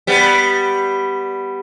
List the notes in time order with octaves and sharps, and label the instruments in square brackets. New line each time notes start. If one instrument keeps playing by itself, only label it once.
[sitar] G3 B3